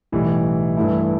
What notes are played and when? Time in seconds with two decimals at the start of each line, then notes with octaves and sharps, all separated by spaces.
0.12 B1 A2 E3 G3
0.76 G2 E3 A3 E4